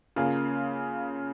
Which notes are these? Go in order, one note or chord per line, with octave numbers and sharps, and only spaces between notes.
C#3 A#3 F4 G#4